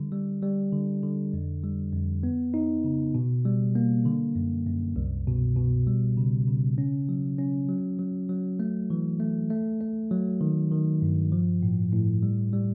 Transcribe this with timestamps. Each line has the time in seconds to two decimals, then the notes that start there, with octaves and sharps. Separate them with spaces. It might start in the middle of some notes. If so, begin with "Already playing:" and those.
Already playing: D3 G3
0.12 G3
0.43 G3
0.73 D3
1.03 D3
1.33 F2
1.64 G3
1.93 F2
2.23 B3
2.54 D#4
2.84 C#3
3.15 B2
3.45 G3
3.75 A#3
4.05 D3
4.35 F#2
4.66 F#2
4.96 C2
5.27 B2
5.56 B2
5.87 G3
6.17 C#3
6.47 C#3
6.78 C#4
7.09 F#3
7.39 C#4
7.69 F#3
7.99 F#3
8.29 F#3
8.60 A3
8.90 E3
9.20 A3
9.50 A3
9.81 A3
10.11 F#3
10.41 D#3
10.71 D#3
11.02 G2
11.32 F3
11.63 A2
11.92 A2
12.23 G3
12.53 G3